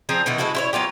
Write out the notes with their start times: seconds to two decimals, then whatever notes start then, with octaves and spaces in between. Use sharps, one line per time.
0.09 F3 C4 G#4 A#5
0.26 B2 D#3 E3 B3
0.38 G#3 E4 F#4 A4
0.55 E4 C5 C#5
0.73 F#3 B3 F4 G4